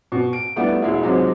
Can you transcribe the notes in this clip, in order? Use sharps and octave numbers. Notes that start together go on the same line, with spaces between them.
B2
D7
E3 G3 A3 B3 D4 E4
E1 G#3 E4
G#2 C3 F3 F#3 G#3